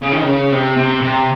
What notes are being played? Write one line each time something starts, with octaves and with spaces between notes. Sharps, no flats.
C#3
D#3
C#3
C3
C3
C3